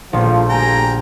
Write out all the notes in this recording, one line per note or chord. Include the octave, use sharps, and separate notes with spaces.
A#1 A2 F3
D2 G4 G5 G#5 A#5